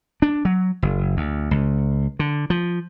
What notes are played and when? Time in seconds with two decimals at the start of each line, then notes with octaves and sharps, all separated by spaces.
0.22 D4
0.45 F#3
0.82 F#1
1.17 D2
1.51 C#2
2.19 D3
2.50 F3